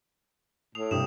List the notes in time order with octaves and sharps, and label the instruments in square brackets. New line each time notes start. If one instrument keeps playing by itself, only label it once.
[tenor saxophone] A2 [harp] D#6 C7 [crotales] F7
[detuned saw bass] G2 [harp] C3 G3 A#3 [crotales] D#6 E7